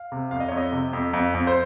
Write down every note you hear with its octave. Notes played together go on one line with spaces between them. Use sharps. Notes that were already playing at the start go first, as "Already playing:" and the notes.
Already playing: F5
C3
F2 F5
D#5
F2 C#5
D#5
C3
F2
F2
F2
C5